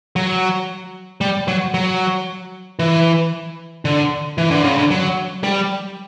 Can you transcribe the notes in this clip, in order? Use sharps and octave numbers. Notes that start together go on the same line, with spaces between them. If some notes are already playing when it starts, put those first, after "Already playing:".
F#3
G3
F#3
F#3
E3
D3
E3
D3
C#3
D3
F#3
G3